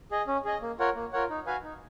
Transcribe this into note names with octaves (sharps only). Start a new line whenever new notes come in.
G#4 D#5
C#4
G#4 D#5
A#3
F4 A#4 C#5 F#5
A#3
F4 A#4 C#5 F#5
D#4
F#4 B4 F5 G#5
D#4